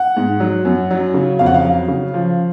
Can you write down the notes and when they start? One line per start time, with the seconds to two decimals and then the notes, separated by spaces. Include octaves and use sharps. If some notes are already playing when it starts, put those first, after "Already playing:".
Already playing: F#5
0.17 G#2
0.40 F#3
0.65 F#2
0.91 F#3
1.14 C#3
1.39 F2 F5
1.46 F#5
1.54 F5
1.64 F#3
1.88 C#3
2.14 F3